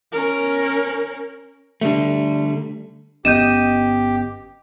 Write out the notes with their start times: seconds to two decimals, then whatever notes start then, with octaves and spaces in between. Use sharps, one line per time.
0.12 C#4 A#4
1.81 D3 G3 A3
3.25 G1 B3 C#4 G4 D#5 G6 D#7 E7